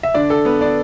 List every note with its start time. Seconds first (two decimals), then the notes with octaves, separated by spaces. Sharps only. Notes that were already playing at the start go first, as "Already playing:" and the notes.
0.03 E5
0.14 D3 D4 D5
0.30 A4
0.45 B3 B4
0.61 D4 D5